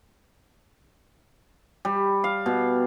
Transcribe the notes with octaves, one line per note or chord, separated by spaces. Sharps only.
G3
F5
B2